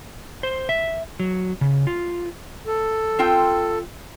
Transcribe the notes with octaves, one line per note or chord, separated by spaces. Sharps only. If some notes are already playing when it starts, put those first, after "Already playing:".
C5
E5
F#3
C#3
F4
A4
C4 F4 G5